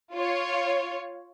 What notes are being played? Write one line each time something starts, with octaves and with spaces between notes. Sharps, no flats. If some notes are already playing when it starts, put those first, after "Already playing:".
F4 C#5